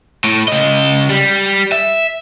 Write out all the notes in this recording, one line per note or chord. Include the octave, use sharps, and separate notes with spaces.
A2
C#3 D#5
G3
E5